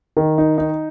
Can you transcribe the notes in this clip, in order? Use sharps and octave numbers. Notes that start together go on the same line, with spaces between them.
D#3
D#4
D#4